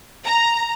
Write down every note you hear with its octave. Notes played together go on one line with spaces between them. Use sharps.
A#5